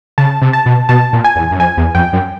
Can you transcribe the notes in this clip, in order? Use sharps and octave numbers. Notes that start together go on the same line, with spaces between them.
C#3 A5
C3
A5
B2
B2 A5
A#2
G#5
E2
F#2
F2 G#5
E2
F2 G5
F#2